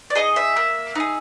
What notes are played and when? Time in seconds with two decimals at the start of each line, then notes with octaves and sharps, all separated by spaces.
0.10 D5
0.15 D#4 G#4 D#5
0.36 E5
0.57 A#3
0.95 D#4 G#4